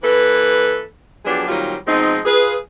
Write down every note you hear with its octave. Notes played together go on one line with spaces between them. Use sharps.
E3 A#3 A4 B4
F3 F#3 B3 D4 G4 G#4
A#2 D#3 F#3 G3 C4 F4
B2 F3 G#3 C4 D#4
F4 G#4 B4